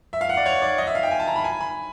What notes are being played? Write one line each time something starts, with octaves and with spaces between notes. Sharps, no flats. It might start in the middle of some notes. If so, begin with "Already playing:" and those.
E5
F5
F#5
D5
C#5
D5
D#5
E5
F5
G5
G#5
A5
A#5
B5
G#5
B5